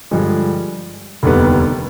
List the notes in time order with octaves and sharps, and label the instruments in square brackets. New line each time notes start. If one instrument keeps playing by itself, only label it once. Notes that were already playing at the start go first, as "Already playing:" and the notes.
[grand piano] G2 D3 F3 G#3
F1 D#2 D3 G3 B3